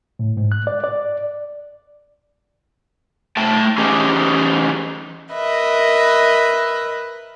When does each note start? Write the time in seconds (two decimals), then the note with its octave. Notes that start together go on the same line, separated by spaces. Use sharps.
0.19 A2
0.37 G#2
0.52 F#6
0.67 D5
0.84 D5
3.37 A3 G5 A5
3.78 E3 A3 C#4 D#4 G4 G#4
5.33 A#4 B4 D#5 E5